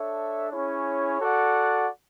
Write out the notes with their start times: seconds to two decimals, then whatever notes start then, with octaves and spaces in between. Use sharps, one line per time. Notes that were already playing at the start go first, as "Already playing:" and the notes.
Already playing: D4 A4 C#5 E5
0.52 C#4 E4 G#4 C#5
1.21 F#4 A4 D5 F#5